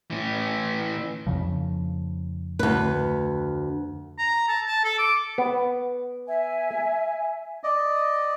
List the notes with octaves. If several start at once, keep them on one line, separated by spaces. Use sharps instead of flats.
A2 E3
F2 C#3 F3
D2 B4
A#5
A5
A5
A4
D6
B3
E5 G#5
D5 D#5